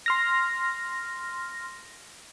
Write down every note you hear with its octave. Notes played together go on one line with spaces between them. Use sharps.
C6 F6 A#6